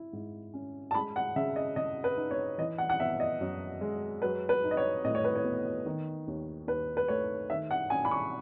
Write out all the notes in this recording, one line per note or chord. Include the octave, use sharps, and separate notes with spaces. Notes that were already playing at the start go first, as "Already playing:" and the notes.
Already playing: E4
G#2
C#4
A5
G#3 B5
F#5
C#3 E5
D#5
C#3 D#5
B4
D#4
C#5
E3 D#5
F#5
F#5
B3 E5
D#5
F#2
G#3
F#3 B4
B4
D#4
D#5
C#5
A2 D#5
C#5
B4
C#5
B3
D#3
D#2
D#2 B4
B4
A3 C#5
D#3 E5
F#5
C#4 G#5
B5
C#6